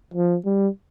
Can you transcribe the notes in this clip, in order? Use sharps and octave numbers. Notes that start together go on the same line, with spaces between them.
F3
G3